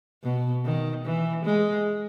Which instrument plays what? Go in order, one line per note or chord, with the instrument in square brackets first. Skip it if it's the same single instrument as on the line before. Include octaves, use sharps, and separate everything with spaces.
[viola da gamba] B2
D#3
E3
G#3